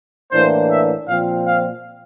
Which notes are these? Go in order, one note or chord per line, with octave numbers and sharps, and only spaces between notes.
A2 E3 A#3 D4 C5
E5
A#2 F3 C4 F5
F5